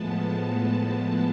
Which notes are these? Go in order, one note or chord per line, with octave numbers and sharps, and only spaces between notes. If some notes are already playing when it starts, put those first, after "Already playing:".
Already playing: A2 F3 G#3 B3 A5